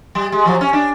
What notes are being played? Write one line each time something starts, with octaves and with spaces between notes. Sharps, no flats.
G3
G#3
F3 F#3
C#4
D4